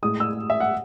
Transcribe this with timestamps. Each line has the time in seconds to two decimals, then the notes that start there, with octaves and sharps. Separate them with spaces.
0.02 A2 G#3 D#6
0.20 E6
0.50 E5
0.60 F#5